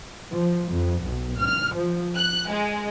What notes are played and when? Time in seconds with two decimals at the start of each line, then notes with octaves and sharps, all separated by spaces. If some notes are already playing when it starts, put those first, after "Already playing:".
0.30 F3
0.70 F2
1.02 B1
1.37 F6
1.74 F3
2.15 F#6
2.49 G#3